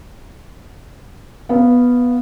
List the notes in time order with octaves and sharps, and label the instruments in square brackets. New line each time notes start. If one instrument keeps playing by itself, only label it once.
[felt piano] B3 F5